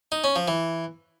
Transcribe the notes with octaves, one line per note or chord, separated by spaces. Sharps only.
D#4
C#4
F3
E3